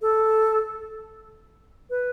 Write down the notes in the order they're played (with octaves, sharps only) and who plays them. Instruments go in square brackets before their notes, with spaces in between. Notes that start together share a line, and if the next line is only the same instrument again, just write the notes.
[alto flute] A4
B4